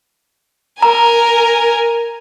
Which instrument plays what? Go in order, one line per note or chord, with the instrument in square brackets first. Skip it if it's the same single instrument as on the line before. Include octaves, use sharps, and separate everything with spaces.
[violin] A#4 G#5 [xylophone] A#5